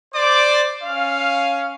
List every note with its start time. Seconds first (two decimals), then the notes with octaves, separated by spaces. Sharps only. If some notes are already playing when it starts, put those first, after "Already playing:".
0.14 C5 D5 D6
0.83 C#4 F5